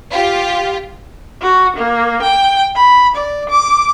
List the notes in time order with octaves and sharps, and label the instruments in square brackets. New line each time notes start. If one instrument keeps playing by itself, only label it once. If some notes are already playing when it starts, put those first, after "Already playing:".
[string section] F4 G4
[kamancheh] F#4
A#3
G5
B5
D5
D6